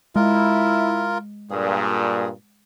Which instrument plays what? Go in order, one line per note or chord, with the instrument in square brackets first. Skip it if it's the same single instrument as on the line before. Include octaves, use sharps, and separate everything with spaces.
[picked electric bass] G#3 [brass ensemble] E4 [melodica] F4 A#4
[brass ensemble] G2 A#2 [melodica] G#4